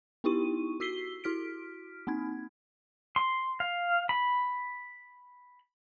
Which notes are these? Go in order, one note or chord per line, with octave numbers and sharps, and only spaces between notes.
B3 D#4 E4 G4 C#6 D#7
F#4 E6 B6 C7 G7
E4 F#4 F6 B6 D7
A#3 C4 D#4 G#6
C6
F5
B5